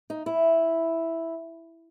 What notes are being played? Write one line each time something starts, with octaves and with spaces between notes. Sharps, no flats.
D#4
E4